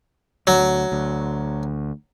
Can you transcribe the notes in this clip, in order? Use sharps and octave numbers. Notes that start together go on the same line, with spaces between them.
D2 F#3
D2